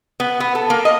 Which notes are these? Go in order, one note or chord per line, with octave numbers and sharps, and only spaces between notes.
B3
B3
A4
A#3
D#5